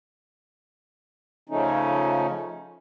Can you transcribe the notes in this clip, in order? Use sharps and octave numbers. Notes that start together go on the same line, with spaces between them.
C#3 F3 A3 C#4 D#4